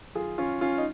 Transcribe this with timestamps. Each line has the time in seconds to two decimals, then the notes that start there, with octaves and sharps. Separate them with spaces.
0.15 F#2 D#3 F4 G#4
0.38 C#4 F4
0.61 C#4 F4
0.78 D#4